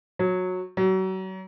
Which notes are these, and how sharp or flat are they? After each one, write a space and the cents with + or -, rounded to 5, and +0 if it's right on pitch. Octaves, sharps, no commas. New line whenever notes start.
F#3 -15
F#3 +35